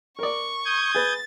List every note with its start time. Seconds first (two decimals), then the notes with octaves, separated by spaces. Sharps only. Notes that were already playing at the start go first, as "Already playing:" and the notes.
0.19 A#4 D5 C#6
0.65 D#6 G6 G#6
0.95 G#4 B4 A6